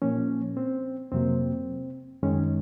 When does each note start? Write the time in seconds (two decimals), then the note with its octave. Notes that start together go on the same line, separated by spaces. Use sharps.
0.02 A#2 F3 A#3 C#4
0.57 C4
1.12 F2 C3 F#3 A#3 C4
2.23 F#2 D#3 G#3 C#4